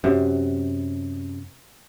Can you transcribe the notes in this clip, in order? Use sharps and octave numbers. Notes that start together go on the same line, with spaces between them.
F#2 C3